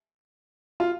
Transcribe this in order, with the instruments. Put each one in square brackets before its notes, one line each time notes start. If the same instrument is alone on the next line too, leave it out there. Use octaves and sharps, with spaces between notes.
[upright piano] F4